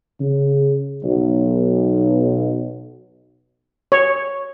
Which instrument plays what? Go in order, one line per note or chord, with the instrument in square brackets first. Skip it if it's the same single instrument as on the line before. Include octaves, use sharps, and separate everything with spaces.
[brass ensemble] C#3
B1
[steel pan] C#5